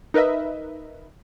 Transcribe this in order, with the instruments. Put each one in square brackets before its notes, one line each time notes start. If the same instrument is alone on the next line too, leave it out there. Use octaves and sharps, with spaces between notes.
[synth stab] D#4 A#4 B4 D#5 E5